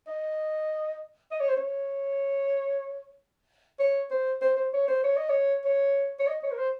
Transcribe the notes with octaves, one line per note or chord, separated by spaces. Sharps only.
D#5
D#5
C#5
C5
C#5
C#5
C5
C5
C5
C#5
C5
C#5
D#5
C#5
C#5
C#5
D#5
C#5
A#4
C5